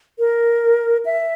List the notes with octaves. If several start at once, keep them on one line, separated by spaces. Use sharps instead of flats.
A#4
E5